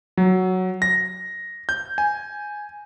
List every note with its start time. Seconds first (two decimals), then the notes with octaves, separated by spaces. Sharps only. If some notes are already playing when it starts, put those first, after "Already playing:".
0.17 F#3
0.82 A#6
1.69 G6
1.98 G#5